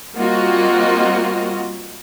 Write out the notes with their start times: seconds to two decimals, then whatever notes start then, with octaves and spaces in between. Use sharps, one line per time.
0.16 G3 A#3 C4 F4 F#4 D#5